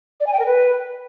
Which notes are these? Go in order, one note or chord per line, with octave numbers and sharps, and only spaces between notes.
D5
G#5
G5
A#4
B4